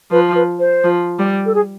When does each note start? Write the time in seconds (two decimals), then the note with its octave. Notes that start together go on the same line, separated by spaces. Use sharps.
0.11 F3 B4
0.35 B4
0.60 C5
0.84 F3
1.19 G3
1.46 A4
1.55 G#4